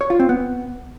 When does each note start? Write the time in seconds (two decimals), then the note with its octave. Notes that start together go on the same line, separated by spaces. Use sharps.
0.01 C#5
0.10 F4
0.20 C4
0.29 B3